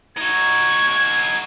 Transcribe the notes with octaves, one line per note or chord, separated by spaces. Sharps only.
D#4 F#4 G#6